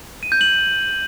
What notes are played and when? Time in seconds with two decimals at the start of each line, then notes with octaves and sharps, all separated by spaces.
0.23 D#7
0.32 G6
0.41 F#7